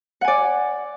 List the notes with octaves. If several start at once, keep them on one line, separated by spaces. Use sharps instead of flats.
D5 F#5 G#5